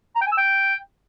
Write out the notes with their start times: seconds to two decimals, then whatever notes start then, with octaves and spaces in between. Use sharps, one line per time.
0.16 A#5
0.21 G5
0.26 G#5
0.32 E6
0.37 G5